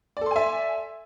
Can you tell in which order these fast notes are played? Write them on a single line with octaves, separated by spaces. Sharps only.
D5 A4 C6 G#5 E5